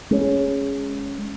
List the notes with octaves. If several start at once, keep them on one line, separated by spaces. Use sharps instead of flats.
G#3 C#4